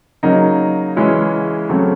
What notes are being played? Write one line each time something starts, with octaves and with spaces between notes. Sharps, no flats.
C#3 F#3 A#3 D#4
C#3 E3 G#3 C#4 E4
C#3 F#3 A3 C4